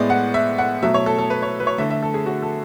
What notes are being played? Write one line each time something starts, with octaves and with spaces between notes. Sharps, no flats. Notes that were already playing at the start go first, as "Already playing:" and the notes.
Already playing: A2 G#3 B3 D5
F#5
E5
F#5
B2 F#3 A3 E5
C#5
A4
A4
B4
C#5
B4
C#5
D3 A3 E5
E5
A4
G#4
F#4
A4